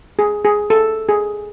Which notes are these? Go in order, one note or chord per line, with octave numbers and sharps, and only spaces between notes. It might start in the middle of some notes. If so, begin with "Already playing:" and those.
G#4
G#4
A4
G#4